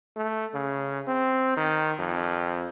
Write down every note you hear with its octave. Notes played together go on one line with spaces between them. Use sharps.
A3
C#3
C4
D#3
F2